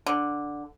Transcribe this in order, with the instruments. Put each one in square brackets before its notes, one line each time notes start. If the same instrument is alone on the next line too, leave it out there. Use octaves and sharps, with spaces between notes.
[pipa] D3